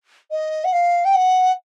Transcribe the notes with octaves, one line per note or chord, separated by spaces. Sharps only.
D#5
F#5
F5
G5
F#5